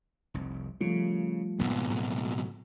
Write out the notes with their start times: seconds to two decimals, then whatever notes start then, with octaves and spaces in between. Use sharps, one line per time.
0.34 F1 C2
0.81 C#3 F3 G3 A3
1.59 C#2 G#2 B2 G#3 B3
1.89 A2 F#3